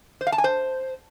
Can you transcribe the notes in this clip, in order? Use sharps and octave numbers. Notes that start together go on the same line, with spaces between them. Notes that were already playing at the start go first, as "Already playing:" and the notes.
C5
F5
A5
G#5
C5